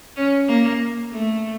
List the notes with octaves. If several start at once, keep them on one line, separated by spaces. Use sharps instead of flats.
C#4
A#3
A3